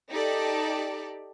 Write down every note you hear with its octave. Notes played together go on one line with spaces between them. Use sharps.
D#4 G4 A4 D5